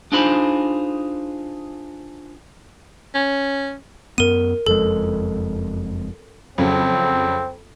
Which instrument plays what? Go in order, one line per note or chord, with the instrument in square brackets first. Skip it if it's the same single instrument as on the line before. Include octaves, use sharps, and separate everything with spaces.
[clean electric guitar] D4 D#4 F4 G#4 C5 B5
[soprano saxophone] C#4
[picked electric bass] F#2 B3 [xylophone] A#4 D#7
[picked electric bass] F#1 F2 G#3 [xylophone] A4
[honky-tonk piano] F2 C#3 F#3 [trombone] C4